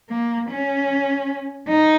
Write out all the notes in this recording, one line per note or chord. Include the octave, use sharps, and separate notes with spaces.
A#3
C#4
D#4